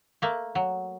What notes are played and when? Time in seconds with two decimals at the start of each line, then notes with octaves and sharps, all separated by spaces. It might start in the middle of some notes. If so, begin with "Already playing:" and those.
0.22 A3 A#3
0.55 F#3